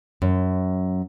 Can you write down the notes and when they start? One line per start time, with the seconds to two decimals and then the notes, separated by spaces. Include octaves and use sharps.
0.22 F#2